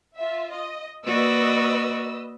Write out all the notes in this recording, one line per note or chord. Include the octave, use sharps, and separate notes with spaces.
F4 E5
D#5
A#3 F#4 B4 D5 D#5 E6